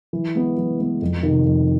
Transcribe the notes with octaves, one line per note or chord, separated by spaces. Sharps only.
E3
G#3 B3
E3
G#3 B3
F2
C3 D#3
F2